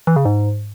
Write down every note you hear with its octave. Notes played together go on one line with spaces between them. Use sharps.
E3
C#3
G#2